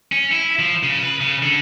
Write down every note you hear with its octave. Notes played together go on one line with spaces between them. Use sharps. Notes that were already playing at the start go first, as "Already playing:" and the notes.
C#4
E4
F3
C#3
B4
C#3
D3